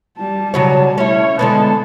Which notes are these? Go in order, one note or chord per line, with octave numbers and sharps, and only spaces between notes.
G3 A5
C#3 F#3 C#5
A3 C#4 E4 C#5
D3 G#3 B3 A5